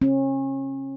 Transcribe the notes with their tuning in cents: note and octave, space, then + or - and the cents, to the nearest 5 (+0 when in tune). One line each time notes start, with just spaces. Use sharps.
C#4 -35